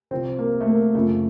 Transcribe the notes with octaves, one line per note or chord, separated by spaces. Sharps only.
C2 C3 F3 C4
A#3
A3
A#3
F#2 C#3 F3 A3